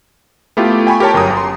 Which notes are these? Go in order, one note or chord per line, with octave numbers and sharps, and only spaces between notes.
A3 B3 E4 F4 G4
G5 G#5 B5 C#6
G4 A#4 C#5 A5
G1 F#2 A#5 D#6
C6